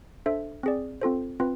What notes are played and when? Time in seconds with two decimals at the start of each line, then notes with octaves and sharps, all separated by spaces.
0.26 D4 A4 C5 E5
0.63 C4 G#4 D5
1.02 C4 F4 A4 C5
1.40 C4 F4 B4